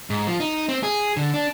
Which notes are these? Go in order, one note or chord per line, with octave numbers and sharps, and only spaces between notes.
G#2
F3
D#4
C4
G#4
D3
D4